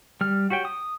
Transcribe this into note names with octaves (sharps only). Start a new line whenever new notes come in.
G3 F6
F#4 G4 C#5 G5
D#6